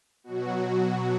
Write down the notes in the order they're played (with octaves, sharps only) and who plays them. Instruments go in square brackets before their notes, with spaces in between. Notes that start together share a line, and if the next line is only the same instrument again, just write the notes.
[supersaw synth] B2 F#3 F#4